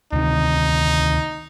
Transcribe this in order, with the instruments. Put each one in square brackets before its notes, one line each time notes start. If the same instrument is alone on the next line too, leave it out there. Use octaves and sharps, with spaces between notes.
[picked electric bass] D2 C3 D#3 [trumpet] D#4